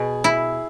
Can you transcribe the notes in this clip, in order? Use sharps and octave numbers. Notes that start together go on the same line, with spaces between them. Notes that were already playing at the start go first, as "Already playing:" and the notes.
Already playing: B2 G#4
E4